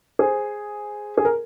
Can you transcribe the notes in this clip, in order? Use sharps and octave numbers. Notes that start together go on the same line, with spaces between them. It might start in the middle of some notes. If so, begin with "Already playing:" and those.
G#4 C5
G#4
A#4